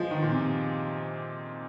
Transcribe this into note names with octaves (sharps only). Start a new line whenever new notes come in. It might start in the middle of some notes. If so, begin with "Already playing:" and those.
Already playing: F3 G#3
D#3
A#2
C3